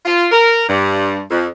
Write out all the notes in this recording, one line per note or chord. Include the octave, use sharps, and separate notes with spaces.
F4
A#4
G2
F2